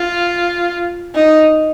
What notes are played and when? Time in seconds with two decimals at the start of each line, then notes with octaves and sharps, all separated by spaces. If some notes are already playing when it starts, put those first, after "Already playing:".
Already playing: F4
1.15 D#4